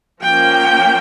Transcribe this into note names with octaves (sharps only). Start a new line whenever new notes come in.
F3 A#3 C#4 G5